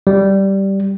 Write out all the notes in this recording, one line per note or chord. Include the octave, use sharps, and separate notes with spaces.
G3